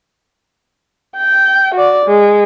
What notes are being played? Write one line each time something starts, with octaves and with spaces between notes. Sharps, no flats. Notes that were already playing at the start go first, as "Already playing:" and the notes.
G5
F#4 D5
G#3